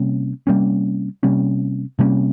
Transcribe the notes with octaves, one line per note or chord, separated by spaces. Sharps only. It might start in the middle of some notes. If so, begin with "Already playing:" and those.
Already playing: C3 G3 A#3 C#4
C3 G3 A#3 C#4
C3 G3 A#3 C#4
C3 G3 A#3 C#4